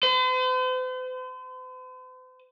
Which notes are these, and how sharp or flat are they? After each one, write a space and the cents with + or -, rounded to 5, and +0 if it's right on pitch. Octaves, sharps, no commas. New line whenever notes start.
C5 -45